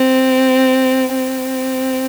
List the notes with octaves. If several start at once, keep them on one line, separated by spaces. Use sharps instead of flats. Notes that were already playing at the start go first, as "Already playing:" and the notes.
Already playing: C4
C4